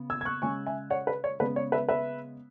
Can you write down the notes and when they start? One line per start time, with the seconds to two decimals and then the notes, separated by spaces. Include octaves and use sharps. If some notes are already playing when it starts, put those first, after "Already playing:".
Already playing: C#3 B3
0.10 E6 G#6
0.21 G#6
0.25 C#6 F#6
0.42 C#3 G#3 C#4 G#5 C#6
0.66 E5 G#5
0.90 C#5 F#5
1.07 B4
1.24 C#5
1.40 C#3 G#3 B3 B4
1.56 C#5
1.72 B4 E5
1.89 B4 E5